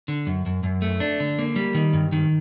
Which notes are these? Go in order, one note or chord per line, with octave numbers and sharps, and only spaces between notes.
D3
F#2
F#2
F#2
A3
D4
D3
A#3
G3
D#3
G2
D#3